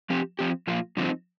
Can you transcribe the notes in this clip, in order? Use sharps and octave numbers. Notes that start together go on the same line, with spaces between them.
F3 C4 G4
F3 C4 G4
A#2 F3 A#3 F4
G2 D3 F3 C4 D#4